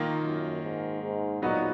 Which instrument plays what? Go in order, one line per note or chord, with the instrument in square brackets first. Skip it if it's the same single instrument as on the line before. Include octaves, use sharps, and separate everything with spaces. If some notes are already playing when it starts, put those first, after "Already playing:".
Already playing: [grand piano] D#3 A#3 F4
[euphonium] F#2
G#2
G#2
[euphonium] A#2 [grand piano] F#3 B3 D#4 F#4